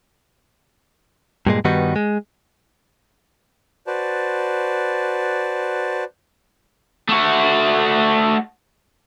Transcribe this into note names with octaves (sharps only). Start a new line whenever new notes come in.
G2 A#2 G#3
G2 D#3 G3 B3 D#4 F#4
G#3
F#4 B4 C5 D5 A5
A3 F#4